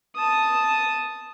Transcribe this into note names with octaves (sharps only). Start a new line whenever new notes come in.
A5 D#6